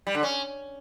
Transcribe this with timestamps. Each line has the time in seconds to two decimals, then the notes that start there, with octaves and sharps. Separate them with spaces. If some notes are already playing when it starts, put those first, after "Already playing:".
0.07 G3
0.15 D3
0.23 C#4